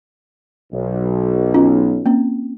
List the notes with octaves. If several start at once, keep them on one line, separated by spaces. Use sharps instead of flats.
B1
C#4 F4
A#3 C4 C#4